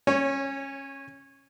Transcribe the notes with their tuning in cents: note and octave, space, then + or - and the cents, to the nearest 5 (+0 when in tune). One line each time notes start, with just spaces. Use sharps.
C#4 -20 C#5 +0